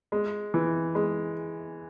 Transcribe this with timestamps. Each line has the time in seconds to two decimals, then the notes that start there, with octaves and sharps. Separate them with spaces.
0.12 G#3
0.54 E3
0.95 G#3